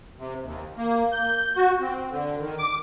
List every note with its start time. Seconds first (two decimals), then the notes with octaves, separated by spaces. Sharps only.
0.19 C3
0.42 D#2
0.77 A#3
1.12 G6
1.56 F#4
1.80 C4
2.11 D3
2.40 D#3
2.58 D6